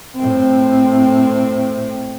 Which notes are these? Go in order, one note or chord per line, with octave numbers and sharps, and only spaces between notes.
A2 C4